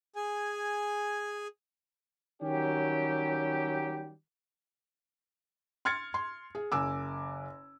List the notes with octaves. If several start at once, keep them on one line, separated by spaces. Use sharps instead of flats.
G#4 G#5
D#3 F#3 G3 C#4 G4
C6 F6 G#6 A6 C#7
C6
G#4
F#1 G#5 D6 E6